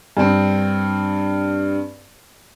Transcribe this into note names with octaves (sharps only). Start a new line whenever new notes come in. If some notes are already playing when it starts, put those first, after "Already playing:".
G2 C4